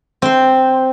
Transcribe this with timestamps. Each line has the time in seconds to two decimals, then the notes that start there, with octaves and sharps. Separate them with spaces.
0.22 C4 C5